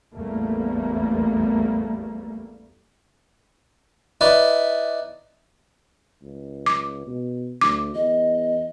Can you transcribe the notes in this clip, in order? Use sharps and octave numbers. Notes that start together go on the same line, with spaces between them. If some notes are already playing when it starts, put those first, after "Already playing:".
A1 E2 G3 A3 A#3
D#4 E4 B4 D5
C#2
D6
B2
D2 D6
E2 D#5